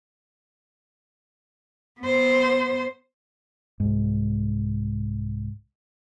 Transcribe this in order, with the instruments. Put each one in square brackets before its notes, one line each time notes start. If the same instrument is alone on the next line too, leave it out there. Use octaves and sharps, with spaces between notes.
[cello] B3 C5
[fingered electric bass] C2 G#2